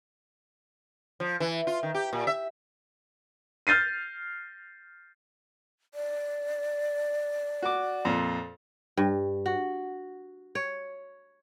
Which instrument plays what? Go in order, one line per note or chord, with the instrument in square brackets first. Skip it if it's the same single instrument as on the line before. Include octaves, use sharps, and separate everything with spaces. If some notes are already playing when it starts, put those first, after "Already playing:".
[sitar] F3
E3
F4
D#3
G4
A#2
E5
[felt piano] F6 G6 A6 C7 D#7
[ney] D5
[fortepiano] F#4 D6
F2 A#2
[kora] G2
F#4
C#5